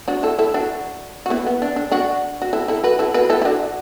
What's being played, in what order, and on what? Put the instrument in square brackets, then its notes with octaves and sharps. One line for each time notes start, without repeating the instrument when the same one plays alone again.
[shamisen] D4 F#4
E4 A4
E4 A4
D4 F#4
F#4
B3 E4
B3
D4
D4
D4 F#4
F#4
E4 A4
E4 A4
F#4 B4
E4 A4
F#4 B4
E4 A4
E4
D4 F#4